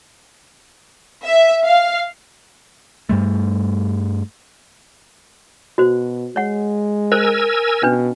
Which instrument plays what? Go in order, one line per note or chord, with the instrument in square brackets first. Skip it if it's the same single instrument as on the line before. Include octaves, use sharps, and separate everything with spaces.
[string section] E5
F5
[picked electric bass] G2 G3 A3
[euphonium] B2 [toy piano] F#4 C5
[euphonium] G#3 [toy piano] C#5 F#5
[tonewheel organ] A#4 G#5 E6 [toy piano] C5
[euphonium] B2 [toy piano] C#4 D4 B4